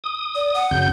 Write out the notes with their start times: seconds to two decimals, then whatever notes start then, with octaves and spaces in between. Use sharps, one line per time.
0.04 D#6
0.35 D5
0.54 F#5
0.71 F#2 C#3 G6